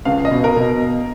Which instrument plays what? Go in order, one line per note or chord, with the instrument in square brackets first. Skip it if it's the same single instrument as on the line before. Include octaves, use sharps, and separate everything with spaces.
[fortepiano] C#2 [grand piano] F5
[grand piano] D#5
[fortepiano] B2
[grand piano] A#4
[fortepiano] B2